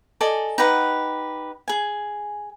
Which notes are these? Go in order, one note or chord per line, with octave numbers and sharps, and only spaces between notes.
A4 D5 D#5 G#5
D#4 G4 B4 F#5
G#4 G#5